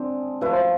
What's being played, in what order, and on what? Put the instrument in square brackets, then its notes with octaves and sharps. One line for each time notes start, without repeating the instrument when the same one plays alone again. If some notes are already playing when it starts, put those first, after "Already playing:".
Already playing: [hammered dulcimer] D3 G#3 D4 [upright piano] C4
[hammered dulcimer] F3 A3 E4 [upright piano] B4
[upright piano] C5